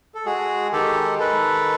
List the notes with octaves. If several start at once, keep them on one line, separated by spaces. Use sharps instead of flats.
A4
G#3 F#4 G#4
D#3 G4 A4
D#3 A4 B4